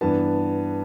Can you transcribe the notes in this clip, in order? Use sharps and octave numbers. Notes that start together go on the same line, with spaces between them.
G2 E3 B3 A5